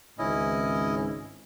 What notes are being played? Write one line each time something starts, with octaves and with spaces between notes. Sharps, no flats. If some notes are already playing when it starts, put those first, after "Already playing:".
G#1 C#2 G#2 C#4 E4 D#5